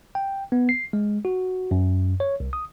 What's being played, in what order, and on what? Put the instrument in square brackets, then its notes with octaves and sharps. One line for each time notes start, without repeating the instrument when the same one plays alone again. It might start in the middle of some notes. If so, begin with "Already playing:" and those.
[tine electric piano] G5
B3
C7
G#3
F#4
F#2
C#5
C2
D#6